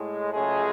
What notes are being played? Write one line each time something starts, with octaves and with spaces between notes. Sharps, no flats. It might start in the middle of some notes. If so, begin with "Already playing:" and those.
Already playing: A2 G#3
C#2 C#3 F#3 G#3 A3 G#4